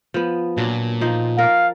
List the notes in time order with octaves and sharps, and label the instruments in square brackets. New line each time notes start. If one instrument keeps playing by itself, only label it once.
[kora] F3 B3
[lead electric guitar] A#2 [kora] F#3 D4
[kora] F3 D#4
[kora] A#4 D5 [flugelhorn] F5